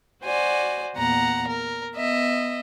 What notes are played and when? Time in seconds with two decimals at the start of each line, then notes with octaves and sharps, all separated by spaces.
0.22 F#4 C5 D5 G#5
0.95 E2 A#2 F#5 A#5
1.47 A#4
1.96 B3 D#5 E5